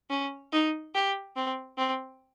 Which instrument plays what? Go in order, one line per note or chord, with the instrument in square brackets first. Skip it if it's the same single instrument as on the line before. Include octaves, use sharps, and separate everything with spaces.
[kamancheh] C#4
D#4
G4
C4
C4